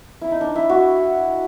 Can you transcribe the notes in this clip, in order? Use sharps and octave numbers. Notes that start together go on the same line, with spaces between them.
E4
D#4
D4
E4
F#4